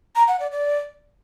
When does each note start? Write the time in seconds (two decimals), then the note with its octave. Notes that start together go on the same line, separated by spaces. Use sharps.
0.16 A#5
0.28 F#5
0.40 D5
0.52 D5